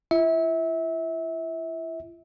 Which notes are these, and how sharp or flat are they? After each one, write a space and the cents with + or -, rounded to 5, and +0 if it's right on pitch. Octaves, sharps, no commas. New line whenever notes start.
E4 +45 E5 -25